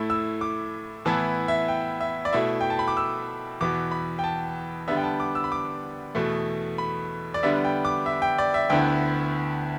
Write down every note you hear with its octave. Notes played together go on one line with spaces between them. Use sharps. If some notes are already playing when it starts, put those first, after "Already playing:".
Already playing: A2 A3 E4
E6
D6
A2 E3 B3 E4 A5
E5
G5
E5
D5
B2 A3 E4 E5
G5
A5
B5
D6
E6
E2 B2 B3 D6
B5
G5
A5
D3 G3 B3 D4 E5
G5
A5
D6
E6
B5
D6
E2 B2 A3
B5
D5
D3 G3 B3 D4 E5
G5
D6
E5
G5
D5
E5
D2 D3 B3 E4 G5